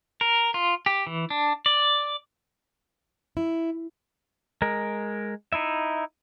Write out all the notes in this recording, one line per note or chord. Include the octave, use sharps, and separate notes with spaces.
A#4
F4
G4
E3
D4
D5
E4
G#3 A#4
D#4 E4 E5